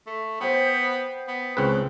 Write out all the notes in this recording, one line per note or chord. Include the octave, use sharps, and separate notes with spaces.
A3
B3 C5 G5
B3
C#2 C#3 C4 B4